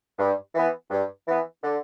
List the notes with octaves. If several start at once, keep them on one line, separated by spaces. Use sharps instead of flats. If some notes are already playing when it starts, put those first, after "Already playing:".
G2
E3 B3
G2
E3 B3
D3